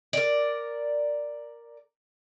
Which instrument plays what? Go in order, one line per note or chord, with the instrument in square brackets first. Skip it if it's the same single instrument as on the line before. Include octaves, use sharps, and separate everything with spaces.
[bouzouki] A#4 D5